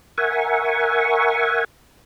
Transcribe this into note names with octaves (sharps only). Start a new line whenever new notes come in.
A#4 E5 F#5 G#5 C#6